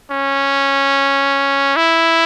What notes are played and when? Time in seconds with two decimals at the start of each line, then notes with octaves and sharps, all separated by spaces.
0.11 C#4
1.76 E4